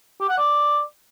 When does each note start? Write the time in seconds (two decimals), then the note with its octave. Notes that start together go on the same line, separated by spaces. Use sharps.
0.20 G4
0.29 F#5
0.38 D5